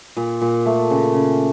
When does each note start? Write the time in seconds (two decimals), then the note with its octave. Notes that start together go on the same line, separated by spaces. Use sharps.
0.17 A#2
0.41 A#2
0.66 A3
0.90 C#3
1.15 C#3